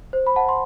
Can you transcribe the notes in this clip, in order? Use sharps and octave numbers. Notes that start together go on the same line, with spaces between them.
C5
B5
F#5 A5
C6